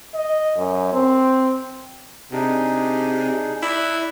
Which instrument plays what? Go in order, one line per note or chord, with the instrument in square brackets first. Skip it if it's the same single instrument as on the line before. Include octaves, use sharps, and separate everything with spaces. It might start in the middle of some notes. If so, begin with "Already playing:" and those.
[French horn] D#5
F#2
C4
[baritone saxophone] C3 [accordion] D4 D#4 G#4
[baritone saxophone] E4 [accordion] D5 F#6